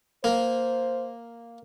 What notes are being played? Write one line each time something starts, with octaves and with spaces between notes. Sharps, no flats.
A#3 C5